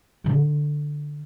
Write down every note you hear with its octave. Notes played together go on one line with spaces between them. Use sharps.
D3 F4